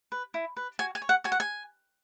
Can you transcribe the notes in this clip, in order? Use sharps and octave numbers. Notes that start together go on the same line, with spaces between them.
B4
E4
B4
F#4 G#5
G#5
C#5
F#5
F#4 G#5
F#5
G#5